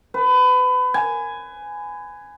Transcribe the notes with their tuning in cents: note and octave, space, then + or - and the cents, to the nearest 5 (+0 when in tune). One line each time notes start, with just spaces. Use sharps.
B4 +30
G#5 +0